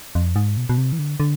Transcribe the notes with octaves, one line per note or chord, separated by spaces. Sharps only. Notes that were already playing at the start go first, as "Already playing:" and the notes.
F2
G#2
B2
B2
C3
E3
D3
D3